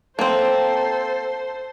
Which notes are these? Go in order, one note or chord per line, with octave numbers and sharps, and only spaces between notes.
A#3 C4 A4 C5